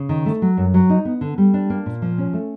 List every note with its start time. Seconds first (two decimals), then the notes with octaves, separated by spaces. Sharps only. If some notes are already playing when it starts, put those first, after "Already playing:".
Already playing: C#3
0.09 D#3
0.26 A3
0.42 F#3
0.57 F#2
0.74 F#3
0.90 D#4
1.05 B3
1.21 D3
1.38 G3
1.54 D4
1.70 A#3
1.86 A#2
2.02 F3
2.18 C#4
2.33 A3